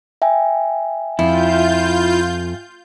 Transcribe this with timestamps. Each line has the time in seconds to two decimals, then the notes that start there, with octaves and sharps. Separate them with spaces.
0.22 E5 G5 G#5
1.19 F2 E4 F4 G6